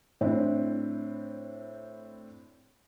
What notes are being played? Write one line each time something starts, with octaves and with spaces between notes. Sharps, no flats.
A2 C4 D4 E4